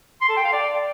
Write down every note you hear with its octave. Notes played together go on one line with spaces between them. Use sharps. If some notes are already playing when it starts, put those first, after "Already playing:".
C6
A4
G5
F5
D5